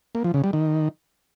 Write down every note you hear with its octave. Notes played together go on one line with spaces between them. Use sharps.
A#3
F3
C#3
G3
D#3